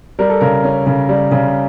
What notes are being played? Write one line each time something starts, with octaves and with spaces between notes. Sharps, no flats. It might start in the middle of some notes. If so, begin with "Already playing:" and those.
G3 A#4
A4
C#3 A#4
C#4
C#3
G3
C#3